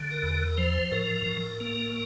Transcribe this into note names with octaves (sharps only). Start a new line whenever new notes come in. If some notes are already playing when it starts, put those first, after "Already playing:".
Already playing: D3
A#4
E2
A#4
F3 C5
A2 A#4
A2
A#3